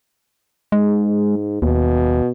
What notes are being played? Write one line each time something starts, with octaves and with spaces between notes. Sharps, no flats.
G#2 G#3
D#2 B2